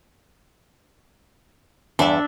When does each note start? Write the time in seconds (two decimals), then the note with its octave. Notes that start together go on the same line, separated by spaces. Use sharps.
1.99 E2 G2 D4 E5